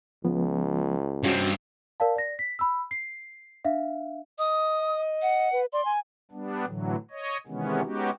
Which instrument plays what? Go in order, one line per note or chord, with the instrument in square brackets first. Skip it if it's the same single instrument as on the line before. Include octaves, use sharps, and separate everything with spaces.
[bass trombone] C#2 [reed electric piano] F3 B3
[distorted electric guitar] G2 C4 [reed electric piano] C#4 F#4
[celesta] A#4 D5 F5 A5
D5 A#6
B6
B5 E6
C7
D4 E5 F5
[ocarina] D#5 [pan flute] D#6
[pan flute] F#5
[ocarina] B4
[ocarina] D5 [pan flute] C6
[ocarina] G#5
[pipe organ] G3 B3 D4
A2 D3 E3 F#3
C#5 D#5
C3 D#3 E3 G#3 B3 C#4
G#3 B3 C#4 D#4 F#4 G4